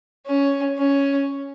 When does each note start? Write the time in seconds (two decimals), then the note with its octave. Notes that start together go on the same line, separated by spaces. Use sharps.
0.26 C#4
0.78 C#4